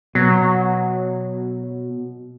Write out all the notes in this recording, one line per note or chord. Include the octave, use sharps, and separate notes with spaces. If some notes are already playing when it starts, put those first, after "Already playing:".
B2 F#3